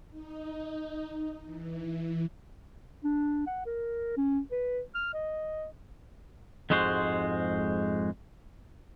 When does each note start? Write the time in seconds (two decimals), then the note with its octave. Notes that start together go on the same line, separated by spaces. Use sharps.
0.11 D#4
1.45 E3
3.04 D4
3.47 F#5
3.66 A#4
4.17 C#4
4.52 B4
4.95 F6
5.14 D#5
6.70 F2 G#2 G#3 F#4 C5